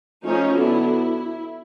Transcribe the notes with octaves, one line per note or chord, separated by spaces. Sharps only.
F3 A3 C#4 D#4
D3 F#3 B3 D4 E4